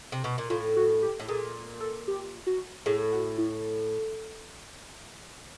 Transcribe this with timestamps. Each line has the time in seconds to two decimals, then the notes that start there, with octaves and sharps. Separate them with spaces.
0.12 C3
0.24 B2
0.38 A#2
0.50 A2 F4
0.76 F#4
1.02 G4
1.20 A2
1.28 A#2 G#4
1.80 A4
2.08 G4
2.47 F#4
2.86 A2 G#4
3.12 F#4
3.38 E4